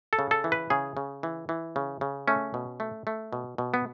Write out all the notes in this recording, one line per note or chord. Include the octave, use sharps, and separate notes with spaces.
A4
C#3
A4
E3
B4
C#3 G#4
C#3
E3
E3
C#3
C#3
A3 C#4
B2
A3
A3
B2
B2
B3